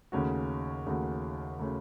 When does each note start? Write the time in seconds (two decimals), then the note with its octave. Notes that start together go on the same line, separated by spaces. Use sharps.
0.12 D#2 C#3 A3 C#4 F#4
0.86 D#2 C#3 A3 C#4 F#4
1.59 C#3 A3 C#4 F#4